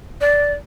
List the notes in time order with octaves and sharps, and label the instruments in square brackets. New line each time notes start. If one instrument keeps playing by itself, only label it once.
[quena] D5